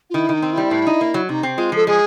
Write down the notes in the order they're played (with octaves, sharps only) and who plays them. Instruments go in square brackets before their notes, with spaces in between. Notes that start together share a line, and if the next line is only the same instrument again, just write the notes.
[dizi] F4
[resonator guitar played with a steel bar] D#3 [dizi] E4
[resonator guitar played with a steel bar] D#3 [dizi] D#4
[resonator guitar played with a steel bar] C4
[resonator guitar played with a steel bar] G3 [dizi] E4
[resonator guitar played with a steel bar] A2
D#4
A#3
F#3
[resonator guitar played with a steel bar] C3 [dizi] D#4
[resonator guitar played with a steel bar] C4
[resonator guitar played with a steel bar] G#3 [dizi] F4
[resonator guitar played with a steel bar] F3 [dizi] A4
[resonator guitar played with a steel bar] G#3 [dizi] G#4